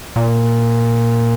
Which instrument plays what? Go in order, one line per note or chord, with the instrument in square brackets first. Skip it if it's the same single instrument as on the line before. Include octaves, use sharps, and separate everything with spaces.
[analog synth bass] A#2